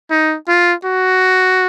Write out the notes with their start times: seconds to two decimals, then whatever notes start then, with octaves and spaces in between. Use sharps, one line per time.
0.11 D#4
0.48 F4
0.84 F#4